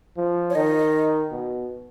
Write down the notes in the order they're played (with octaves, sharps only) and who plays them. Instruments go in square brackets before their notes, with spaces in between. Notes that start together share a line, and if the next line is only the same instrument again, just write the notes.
[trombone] F3
[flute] C#5
[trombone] D#3 [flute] D#5
[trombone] B2